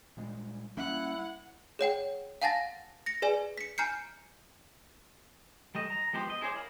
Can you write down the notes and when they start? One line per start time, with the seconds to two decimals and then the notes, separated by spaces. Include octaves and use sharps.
0.17 A#2 G3 G#3
0.77 G3 A#3 C#4 E4 F#5
1.79 G#4 C#5 F#5 G5
2.41 F5 F#5 G#5 A5 A6 A#6
3.06 A#6 C#7
3.22 G#4 B4 D5 G#5
3.58 B6 C#7
3.78 G#5 A#5 F6 G6 C7 C#7
5.75 G3 A3 D#5
5.90 A#5
6.13 F3 G#3 B3 G4 C5
6.30 D#5
6.41 E4 G#4 C5 C#5 D6
6.56 A#4 F5 B5